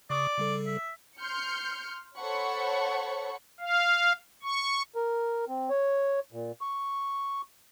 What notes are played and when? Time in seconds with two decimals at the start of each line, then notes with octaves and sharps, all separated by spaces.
0.10 C#3 D5 C#6 D#6
0.38 C#3 G3 A4
0.66 E5
1.20 C6 F6 G6 C#7
2.17 A4 C5 C#5 F#5 B5 C#6
3.60 F5
4.43 C#6
4.95 A#4
5.49 C4
5.70 C#5
6.32 A#2
6.61 C#6